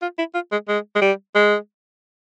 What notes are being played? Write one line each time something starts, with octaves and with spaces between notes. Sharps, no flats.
F4
E4
F4
G#3
G#3
G#3
G3
G#3